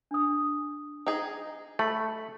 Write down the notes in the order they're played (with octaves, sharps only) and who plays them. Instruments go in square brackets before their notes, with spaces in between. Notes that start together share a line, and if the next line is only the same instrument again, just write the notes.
[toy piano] D4 D#6
[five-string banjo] D#4 G#4
[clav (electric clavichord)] A3 [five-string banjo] B5